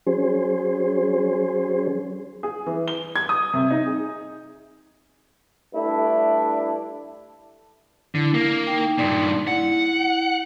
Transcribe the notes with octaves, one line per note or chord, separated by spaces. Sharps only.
F#3 C#4 G#4 C5
G#4
E3
G7
G#6
D#6
C3
D#4
G#4
G2 A3 D4 E4
D3 E4
A#3
D#4 G5
G2 A#2 D#4 D5 C6
E4 F#5